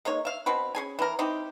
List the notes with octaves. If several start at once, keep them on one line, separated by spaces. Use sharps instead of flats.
G#3 A#3 D#4 C#5
E5 F5
B2 C4 F#4 B4
C#4 G#4 G#5
E3 A#4
C4 D#4 E4 G4